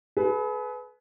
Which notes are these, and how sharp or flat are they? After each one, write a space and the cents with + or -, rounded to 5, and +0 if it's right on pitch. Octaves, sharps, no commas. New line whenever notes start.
G#4 +40 B4 +5